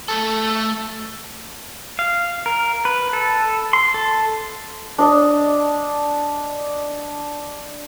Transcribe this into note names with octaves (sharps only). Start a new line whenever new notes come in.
A3 A4
F5
A#4
B4
A4
C6
A4
D4 D#5